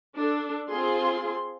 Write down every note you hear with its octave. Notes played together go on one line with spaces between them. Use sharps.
D4 A4
C4 F4 G#4 C6